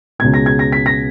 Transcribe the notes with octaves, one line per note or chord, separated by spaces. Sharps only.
C#2 B2 G#3 G#6
A#6
G#6
A#6
B6
A#6